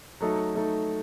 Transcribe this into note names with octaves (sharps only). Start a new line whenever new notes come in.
F#3 A3 D#4 A4
F#3 A3 D#4 A4